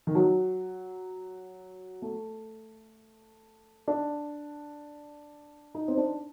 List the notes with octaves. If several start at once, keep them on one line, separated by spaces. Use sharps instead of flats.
D#3
F#3
A3
D4
D#4
C4
D4